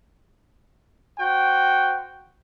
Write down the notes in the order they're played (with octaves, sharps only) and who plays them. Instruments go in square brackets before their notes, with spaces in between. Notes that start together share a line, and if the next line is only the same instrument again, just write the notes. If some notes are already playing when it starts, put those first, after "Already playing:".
[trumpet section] F#4 C5 G5